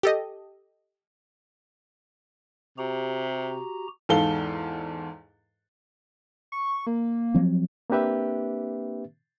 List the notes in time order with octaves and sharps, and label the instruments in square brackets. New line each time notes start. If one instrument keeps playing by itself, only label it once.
[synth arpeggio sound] G4 A4 D#5
[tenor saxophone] C3 [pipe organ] F#4 G4 A#5
[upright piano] E2 G#2 A4 F5 G7
[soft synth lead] C#6
A#3
[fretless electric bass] F3 F#3 C4
[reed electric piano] A#3 C4 D4 G4 B4 E5